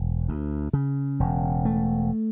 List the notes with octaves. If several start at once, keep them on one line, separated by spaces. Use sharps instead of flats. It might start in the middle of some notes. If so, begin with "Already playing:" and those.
Already playing: E1
D2
C#3
E1
A3